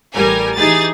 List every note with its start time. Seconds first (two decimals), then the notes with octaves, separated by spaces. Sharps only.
0.13 A1 G3 A#4 G#5
0.56 E3 D#4 G4 G#4 A6